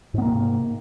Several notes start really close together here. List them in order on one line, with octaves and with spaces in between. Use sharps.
G#2 B3 A#3 C3